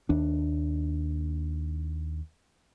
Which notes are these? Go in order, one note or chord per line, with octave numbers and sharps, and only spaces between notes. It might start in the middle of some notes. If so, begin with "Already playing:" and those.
D#2 D4